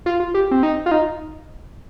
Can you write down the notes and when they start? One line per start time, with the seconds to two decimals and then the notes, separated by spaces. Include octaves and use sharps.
0.06 F4
0.20 F4
0.34 G4
0.51 C4
0.63 D#4
0.86 F4
0.91 D#4